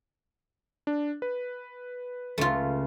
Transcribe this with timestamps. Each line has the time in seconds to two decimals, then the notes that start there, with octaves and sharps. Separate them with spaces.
0.87 D4
1.22 B4
2.38 C#2 A3 F4